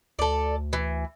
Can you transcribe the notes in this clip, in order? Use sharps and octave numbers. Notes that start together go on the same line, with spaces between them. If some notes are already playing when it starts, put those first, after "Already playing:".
D2 A4 D5
E3